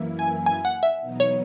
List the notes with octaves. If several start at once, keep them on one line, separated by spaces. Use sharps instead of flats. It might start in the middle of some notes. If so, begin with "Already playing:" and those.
Already playing: F#2 E3 A#3 E4
G#5
G#5
F#5
E5
E2 B2 F#3 B3 D#4
C#5